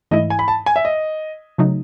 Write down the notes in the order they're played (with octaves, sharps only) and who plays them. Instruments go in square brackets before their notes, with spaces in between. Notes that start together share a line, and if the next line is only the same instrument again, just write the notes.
[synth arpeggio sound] G#2 E3 A3 E4 [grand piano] D#5
[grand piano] G#5
B5
A5
G#5
E5
D#5
[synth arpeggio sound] C#3 F#3 A3 D#4